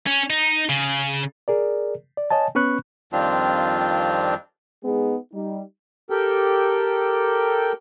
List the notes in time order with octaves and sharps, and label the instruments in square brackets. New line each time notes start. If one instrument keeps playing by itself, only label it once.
[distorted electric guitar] C#4
D#4
C#3
[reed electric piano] G#4 A#4 D5
D5
C#5 D#5 G#5 A5
B3 C#4 B4 B5 C#6 F#6
[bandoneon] F2 D#3 G3 C4 D4 F4
[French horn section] G#3 B3 D#4 G#4
G3 D#4
[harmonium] G4 A4 A#4 G5